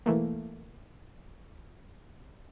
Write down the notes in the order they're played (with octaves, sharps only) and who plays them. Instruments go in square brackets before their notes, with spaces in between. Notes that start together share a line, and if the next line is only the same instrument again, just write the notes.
[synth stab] B1 E3 A3 A#3